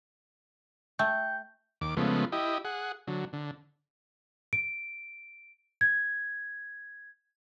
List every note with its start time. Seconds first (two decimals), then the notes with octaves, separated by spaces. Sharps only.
0.99 A3 G5 G6
1.81 D#2 D6
1.97 C#3 F3 G#3 A3 B3
2.32 E4 G4 D#5
2.65 G#4 F#5
3.07 D3 F#3
3.33 D3
4.53 D7
5.81 G#6